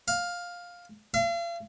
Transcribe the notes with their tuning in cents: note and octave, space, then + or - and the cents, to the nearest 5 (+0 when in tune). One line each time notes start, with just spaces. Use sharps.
F5 +10
F5 -40